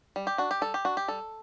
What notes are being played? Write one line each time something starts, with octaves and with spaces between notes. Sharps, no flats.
G3
G4
D4 F#4
G4
G3 A4
G4
D4 F#4
G4
G3 A4